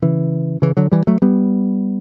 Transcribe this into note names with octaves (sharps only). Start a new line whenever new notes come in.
C#3 E3
C#3 E3
D3 F#3
E3 G3
F#3 A3
G3 B3